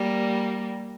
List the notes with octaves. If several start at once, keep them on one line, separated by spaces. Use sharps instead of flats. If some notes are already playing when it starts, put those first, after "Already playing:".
Already playing: G3 A#3